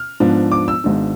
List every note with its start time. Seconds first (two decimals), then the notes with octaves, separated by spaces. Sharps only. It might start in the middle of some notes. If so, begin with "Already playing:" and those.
Already playing: F6
0.20 G#2 F3 B3 D4
0.52 D6
0.68 E6
0.84 G#1 G#2 G#3 B3 D4